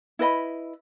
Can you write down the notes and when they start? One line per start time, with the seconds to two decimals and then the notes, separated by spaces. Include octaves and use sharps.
0.19 E4 B4 D#5 B5